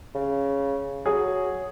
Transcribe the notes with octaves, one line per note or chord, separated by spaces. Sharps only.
C#3
F#3 G#4